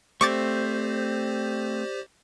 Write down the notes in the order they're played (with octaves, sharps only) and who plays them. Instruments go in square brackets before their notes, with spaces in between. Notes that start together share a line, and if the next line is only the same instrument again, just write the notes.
[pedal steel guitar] A3 C4 [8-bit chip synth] G4 C5 D5 [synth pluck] C#6 D6 A6